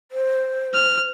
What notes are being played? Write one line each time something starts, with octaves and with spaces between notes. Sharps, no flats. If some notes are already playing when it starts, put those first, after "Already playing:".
C5
F6